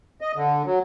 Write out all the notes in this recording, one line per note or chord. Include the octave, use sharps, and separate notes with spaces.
D#5
D3
F#3